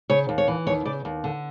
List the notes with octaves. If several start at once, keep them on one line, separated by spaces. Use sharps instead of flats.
C#3 C#5
D#2
C#5
E3
D#2 C#5
C#3 D5
D#2
D3